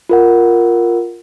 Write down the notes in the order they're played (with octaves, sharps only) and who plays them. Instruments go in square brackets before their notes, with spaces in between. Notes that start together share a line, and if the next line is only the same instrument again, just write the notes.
[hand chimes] F4 A#4 F#5